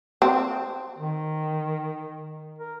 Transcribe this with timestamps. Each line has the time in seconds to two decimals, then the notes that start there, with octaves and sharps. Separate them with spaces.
0.22 C4
0.98 D#3
2.59 A#4